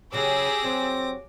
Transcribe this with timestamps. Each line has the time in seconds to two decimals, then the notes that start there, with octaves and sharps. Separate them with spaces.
0.12 C#3 F#3 C#4 G4 G#4 D6 E6 A#6
0.64 F#3 C4